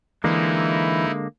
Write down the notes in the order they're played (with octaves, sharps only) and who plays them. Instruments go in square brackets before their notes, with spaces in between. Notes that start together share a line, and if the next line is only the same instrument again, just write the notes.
[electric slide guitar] D3 G#3 A#3 [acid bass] E3 [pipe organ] D#4 E4